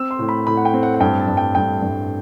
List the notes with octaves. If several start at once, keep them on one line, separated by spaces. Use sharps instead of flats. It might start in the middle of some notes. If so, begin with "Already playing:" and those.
Already playing: C4 E6
C6
A2
B5
A2 B5
F#5
G5
C4
F#5
F#5
G2 G5
A5
G2
G5
G2 G5
G2